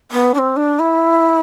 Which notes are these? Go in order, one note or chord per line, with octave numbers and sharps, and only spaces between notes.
B3
D4
C4
D4
E4